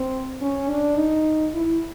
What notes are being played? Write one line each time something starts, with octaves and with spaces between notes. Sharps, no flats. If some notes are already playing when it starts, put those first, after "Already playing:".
Already playing: C4
C#4
D4
D#4
E4